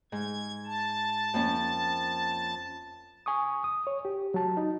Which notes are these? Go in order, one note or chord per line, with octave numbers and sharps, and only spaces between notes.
G#2 G#6
A5
F2 A#3 C#4
G#5 C#6 D#6
D#6
C#5
G4
F#3 A5
D#4